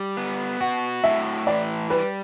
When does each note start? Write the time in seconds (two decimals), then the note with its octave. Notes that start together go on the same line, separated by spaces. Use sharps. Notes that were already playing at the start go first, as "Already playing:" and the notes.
Already playing: G3
0.17 B3
0.61 F#4 F#5
1.04 A2 E5
1.47 E3 D5
1.90 G3 B4